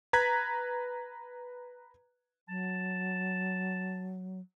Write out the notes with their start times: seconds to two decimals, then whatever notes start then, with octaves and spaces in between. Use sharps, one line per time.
0.13 B4 A#5 F#6 G#6 B6
2.48 F#3 A5